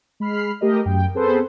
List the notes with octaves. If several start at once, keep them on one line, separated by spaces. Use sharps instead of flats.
G#3 B5 F6 C7
A3 G4 A#4 D#5
F#2 G5
B3 C4 G#4 A4 B4 C5